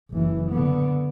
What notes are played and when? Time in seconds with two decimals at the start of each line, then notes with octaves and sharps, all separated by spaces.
0.11 F#1 E3
0.51 D3 B3